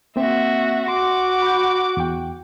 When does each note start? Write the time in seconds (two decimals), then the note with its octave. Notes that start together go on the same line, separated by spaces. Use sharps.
0.16 A#3 C4 F#4 E5
0.88 F#4 C6 D6
1.42 B5 G6
1.97 E2 G5